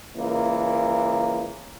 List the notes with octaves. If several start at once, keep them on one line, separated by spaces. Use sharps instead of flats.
C#2 E3 A#3